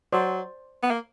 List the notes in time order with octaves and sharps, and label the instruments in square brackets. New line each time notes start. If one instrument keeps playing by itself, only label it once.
[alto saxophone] F#3 [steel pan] C5 D5
[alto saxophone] B3
A#3